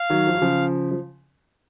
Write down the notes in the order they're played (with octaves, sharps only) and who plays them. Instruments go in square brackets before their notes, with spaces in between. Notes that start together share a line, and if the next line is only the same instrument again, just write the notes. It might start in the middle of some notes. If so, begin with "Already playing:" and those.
Already playing: [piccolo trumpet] F5
[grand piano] D#3 F#3
F3
F#3
C#3 F3
F3